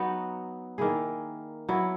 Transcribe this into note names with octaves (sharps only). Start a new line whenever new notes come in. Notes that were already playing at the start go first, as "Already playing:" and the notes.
Already playing: F#3 B3 D#4 F#4
D#3 A#3 E4 G#4
F#3 B3 E4